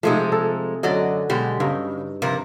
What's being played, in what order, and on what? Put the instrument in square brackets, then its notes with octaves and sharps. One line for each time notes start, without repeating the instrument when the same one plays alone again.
[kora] C3 A3 [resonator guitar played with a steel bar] F3 G#3 D#4
[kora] A4
[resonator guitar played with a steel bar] F#2 D5 D#5 [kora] D3 F#3
[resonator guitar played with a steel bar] B2 G#3 G4
[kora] G2 D#4 [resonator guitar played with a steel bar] C#3
[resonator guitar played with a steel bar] F2 C3 A#4